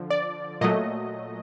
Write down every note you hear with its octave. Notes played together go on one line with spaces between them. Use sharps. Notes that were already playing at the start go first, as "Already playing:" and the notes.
Already playing: D3 F3
D5
A#2 F#3 A3 D#5